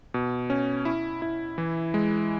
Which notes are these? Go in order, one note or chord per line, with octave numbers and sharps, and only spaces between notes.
B2
C#4
E4
E4
E3
G#3